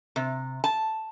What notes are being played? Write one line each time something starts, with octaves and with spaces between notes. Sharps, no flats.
C3
A5